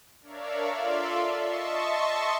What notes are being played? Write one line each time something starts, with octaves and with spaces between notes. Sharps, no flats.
D4 A#4 C#5 D5 E5 F5
F4 A4 D5 E5 F5 C6
D#5 E5 A5 C6 C#6